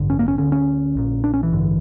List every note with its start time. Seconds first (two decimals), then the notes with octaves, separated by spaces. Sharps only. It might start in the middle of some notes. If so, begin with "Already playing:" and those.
Already playing: A1 G2 D3
0.10 C#4
0.19 A#3
0.28 C#4
0.38 D2 D3 C#4
0.52 C#4
0.95 A#1 A#2
1.24 D4
1.34 C#4
1.43 E3
1.52 A1 G2 D3